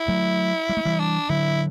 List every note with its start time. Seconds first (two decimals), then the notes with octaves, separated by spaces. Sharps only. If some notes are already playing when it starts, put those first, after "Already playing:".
Already playing: E4
0.08 F#3 A3
0.69 G3
0.77 A3
0.85 E3 G3
0.99 D4
1.30 D3 F#3 E4